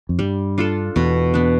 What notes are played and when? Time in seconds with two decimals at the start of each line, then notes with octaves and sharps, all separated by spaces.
0.09 F2
0.19 G2 G3
0.58 D4 F4 A4
0.96 E2 B2
1.34 B3 D4